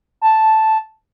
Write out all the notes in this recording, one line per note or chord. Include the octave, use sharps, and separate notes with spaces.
A5